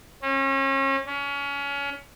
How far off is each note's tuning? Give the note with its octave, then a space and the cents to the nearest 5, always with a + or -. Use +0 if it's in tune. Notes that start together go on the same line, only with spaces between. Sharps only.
C#4 -35
C#4 +30